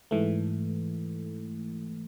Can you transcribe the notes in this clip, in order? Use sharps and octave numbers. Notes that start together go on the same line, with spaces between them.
G#2 E3 A3